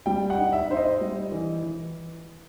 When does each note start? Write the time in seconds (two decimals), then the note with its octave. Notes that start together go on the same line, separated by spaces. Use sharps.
0.06 G3 G5
0.30 F#5
0.38 D#4
0.53 E5
0.70 D#4 C5
0.77 D#5
1.01 G3
1.32 E3
1.63 E3